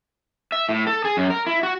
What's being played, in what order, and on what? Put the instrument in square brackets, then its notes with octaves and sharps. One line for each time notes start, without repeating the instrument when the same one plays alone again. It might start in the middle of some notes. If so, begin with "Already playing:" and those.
[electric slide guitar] E5
A2
A4
G#4
F#2
A#4
E4
F#4